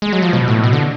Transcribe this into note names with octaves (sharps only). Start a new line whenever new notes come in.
G#3
F#3
F3
B2
A2
B2
D3